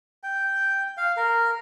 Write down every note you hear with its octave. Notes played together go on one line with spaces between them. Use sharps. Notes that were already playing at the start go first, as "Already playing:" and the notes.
G5
F5
A#4